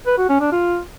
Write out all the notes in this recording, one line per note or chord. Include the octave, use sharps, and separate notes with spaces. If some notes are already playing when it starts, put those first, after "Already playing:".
B4
F#4
C#4
D4
F4